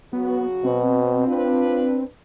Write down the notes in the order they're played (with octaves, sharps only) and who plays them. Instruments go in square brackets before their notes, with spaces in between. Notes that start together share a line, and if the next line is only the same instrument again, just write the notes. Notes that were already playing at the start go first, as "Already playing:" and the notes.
[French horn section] C#3 F#3 F#4 [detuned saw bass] B3
[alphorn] B2 [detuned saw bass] C4
[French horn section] D4 B4 [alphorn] F4